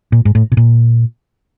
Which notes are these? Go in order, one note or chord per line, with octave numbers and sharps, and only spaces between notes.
A#2
G#2
A2
B2
A#2